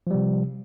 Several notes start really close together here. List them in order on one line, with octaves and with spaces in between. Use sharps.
F3 G3 C3